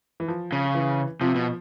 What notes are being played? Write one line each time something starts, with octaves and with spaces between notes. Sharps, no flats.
E3
F3
C#3
E3
C3 F3
B2